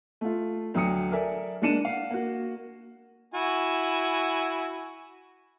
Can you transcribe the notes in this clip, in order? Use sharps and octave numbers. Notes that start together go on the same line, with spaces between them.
A3 F4
D2 F#3 G5 D#6 C#7
A4 A#4 D5 E5 G#5
G#3 A#3 D4 C#7 D#7 E7
F5 F#5
A#3 F#4
E4 F#4 G#5